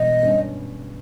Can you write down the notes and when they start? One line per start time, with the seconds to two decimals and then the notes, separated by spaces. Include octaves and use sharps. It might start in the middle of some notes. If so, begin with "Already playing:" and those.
Already playing: E1 G3 D#5
0.23 G2 G3 C#4